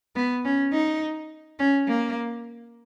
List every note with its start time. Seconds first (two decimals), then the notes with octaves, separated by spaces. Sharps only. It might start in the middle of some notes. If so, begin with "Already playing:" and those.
0.16 B3
0.45 C#4
0.73 D#4
1.59 C#4
1.88 A#3